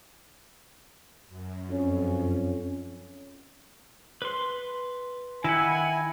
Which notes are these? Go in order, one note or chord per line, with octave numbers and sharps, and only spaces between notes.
F#2
F2 C#4
B4 C6
D#3 E4 F#5 G#5